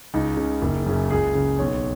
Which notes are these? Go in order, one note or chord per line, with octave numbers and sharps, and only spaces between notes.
C#2 D#4
C#3
F#1
F#2 C#3
C#2 G#4
C#3
B1 C#5